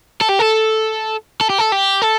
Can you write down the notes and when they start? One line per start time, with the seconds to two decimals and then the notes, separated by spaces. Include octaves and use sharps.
0.21 A4
0.29 G4
0.40 A4
1.41 A4
1.50 G4
1.59 A4
1.72 G4
2.02 A4